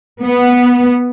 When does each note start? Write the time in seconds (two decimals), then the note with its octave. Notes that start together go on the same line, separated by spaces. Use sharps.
0.23 B3